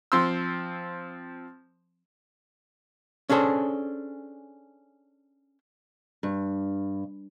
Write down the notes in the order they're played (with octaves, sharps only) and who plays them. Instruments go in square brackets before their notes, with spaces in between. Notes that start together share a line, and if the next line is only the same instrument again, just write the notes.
[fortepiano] F3 C4 C6 E6
[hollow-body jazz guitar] C#4 D4 G#4 A4 C5
[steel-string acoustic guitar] G2